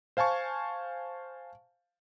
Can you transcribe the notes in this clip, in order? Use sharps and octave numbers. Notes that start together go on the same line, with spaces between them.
C5 F5 G#5 A5 C#6